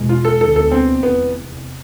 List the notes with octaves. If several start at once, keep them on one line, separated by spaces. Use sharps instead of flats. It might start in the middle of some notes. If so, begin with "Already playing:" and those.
Already playing: E2 B2 G#3
F4
A4
D2 D3 G#3 B3 A4
A4
C4
F1 E2 C3 B3